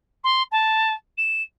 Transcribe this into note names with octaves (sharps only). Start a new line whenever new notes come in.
C6
A5
E7